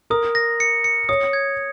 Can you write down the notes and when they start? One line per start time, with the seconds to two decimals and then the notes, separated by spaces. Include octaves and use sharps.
0.10 A#4 D#6
0.35 A#6
0.60 C#7
0.84 C#7
1.09 C#5 D#6
1.33 G#6